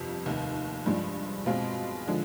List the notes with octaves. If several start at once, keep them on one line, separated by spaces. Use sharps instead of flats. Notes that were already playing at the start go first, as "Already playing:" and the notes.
Already playing: G1 F2 C3
F1 D#2 D#3
G2 F3 G#3 D4
B2 G#3 C4 F4
D3 F3 G#3